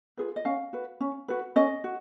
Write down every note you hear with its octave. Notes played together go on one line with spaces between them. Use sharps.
F4 G#4 B4
D#5
C#4 F5
F#4 B4
C#4
F#4 B4
C#4 D#5
F#4